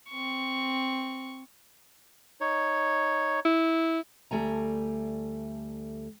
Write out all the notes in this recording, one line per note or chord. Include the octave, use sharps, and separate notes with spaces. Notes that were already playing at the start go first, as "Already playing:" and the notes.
C4 C#6
D#4 C#5
E4
D2 G3 A3 G#5 A#5